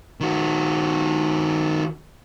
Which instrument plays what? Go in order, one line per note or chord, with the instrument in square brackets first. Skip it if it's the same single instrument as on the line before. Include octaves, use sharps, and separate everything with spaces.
[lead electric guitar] D#3 F#4